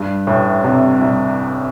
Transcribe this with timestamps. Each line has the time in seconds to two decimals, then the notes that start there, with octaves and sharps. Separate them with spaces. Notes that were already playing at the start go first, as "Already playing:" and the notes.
Already playing: G2
0.27 A1 A2
0.64 C2 C3
1.01 C2 C3